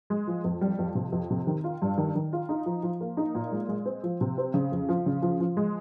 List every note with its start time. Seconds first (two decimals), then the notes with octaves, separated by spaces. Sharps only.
0.10 G#3
0.27 F3
0.44 F2
0.61 G3
0.79 F2
0.95 C3
1.12 F2
1.31 C3
1.47 D#3
1.64 F4
1.82 G2
1.98 D#3
2.15 D#3
2.33 F4
2.49 D#4
2.66 F3
2.83 F3
3.01 A#3
3.17 D#4
3.35 A#2
3.52 G#3
3.69 G#3
3.86 C4
4.03 F3
4.21 C3
4.38 C4
4.54 C#3
4.72 F2
4.89 F3
5.06 C#3
5.22 F3
5.40 F3
5.57 G#3